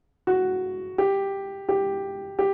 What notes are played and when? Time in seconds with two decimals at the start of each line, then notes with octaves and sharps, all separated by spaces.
0.27 F#4
0.98 G4
1.69 G4
2.39 G4